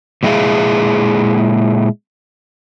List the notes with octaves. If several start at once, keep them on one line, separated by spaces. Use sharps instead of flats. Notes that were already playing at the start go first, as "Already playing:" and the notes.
A#2 E3 G#3 E4 G#4 F5